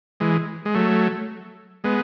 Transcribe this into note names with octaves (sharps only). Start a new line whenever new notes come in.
E3 G#3
G#3
F#3 A3
G#3 B3